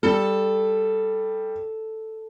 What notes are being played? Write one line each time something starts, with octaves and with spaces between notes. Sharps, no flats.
G3 A4